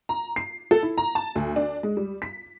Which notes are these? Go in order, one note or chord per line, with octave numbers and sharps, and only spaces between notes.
A#5
C7
A4
E4
A#5
A5
D2
D4
G#3
G3
B6